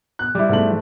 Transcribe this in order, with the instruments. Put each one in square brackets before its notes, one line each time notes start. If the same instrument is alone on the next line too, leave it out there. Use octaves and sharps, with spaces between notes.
[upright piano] F#6
[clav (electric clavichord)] G3 E4
[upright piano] G#2 A3 F#7